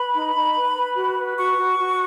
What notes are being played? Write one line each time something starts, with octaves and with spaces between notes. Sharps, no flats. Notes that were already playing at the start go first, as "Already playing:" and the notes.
Already playing: B4 B5
D#4
D#4
B4
B4
F#4
B4
F#4 C#6
F#4
F#4